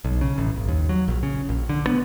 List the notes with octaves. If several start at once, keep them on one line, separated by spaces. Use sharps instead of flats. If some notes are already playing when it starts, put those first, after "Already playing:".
B1
C#3
A1
G1
D#2
F#3
A#1
C#3
A#1
D3
B3